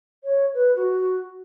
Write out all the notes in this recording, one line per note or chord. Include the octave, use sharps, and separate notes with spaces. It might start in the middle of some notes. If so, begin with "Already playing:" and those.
C#5
B4
F#4